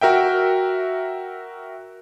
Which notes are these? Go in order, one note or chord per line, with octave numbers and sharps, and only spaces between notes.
F#4 A#4 E5 G5